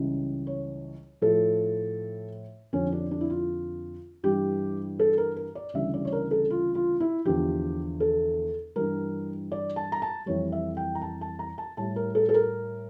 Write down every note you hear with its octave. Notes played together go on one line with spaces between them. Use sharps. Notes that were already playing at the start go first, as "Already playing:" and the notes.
Already playing: C#2 C#3 E3 G3
C#5
A2 F3 A4
F2 D3 F3 C#4
D4
D4
E4
F4
G2 E3 G3 G4
A4
A#4
A#4
D5
D2 C#3 E3 G3 E5
D5
C#5
A#4
A4
F4
F4
E4
E2 D3 F3 G4
A4
G2 E3 G3 A#4
D5
A5
A#5
A5
F2 E3 G3 C#5
E5
G5
A#5
A5
A5
A#5
A5
A2 G3 A5
A#4
A4
A4
A#4